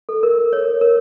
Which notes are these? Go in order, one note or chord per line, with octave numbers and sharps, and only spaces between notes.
A4
A#4
C#5
A#4